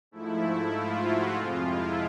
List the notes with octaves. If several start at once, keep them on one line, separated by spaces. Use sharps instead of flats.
G#2 F3 A3 E4
E4
F4
F#4
F2 C3 F3 G#3 F4
E4